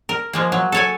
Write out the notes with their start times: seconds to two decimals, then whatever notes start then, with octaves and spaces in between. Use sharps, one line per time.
0.09 A#4
0.33 F3 G#3 A#3
0.52 F#3
0.72 A4 C#5 G#5